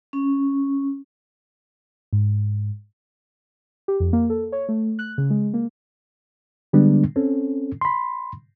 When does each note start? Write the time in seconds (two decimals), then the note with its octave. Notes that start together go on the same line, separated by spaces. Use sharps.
0.13 C#4
2.13 G#2
3.88 G4
4.00 F2
4.13 A#3
4.30 A4
4.52 C#5
4.69 A3
4.99 F#6
5.18 C#3
5.30 G#3
5.54 A#3
6.73 D3 G3 G#3 B3 D4
7.16 C4 C#4 A4
7.81 B5 C6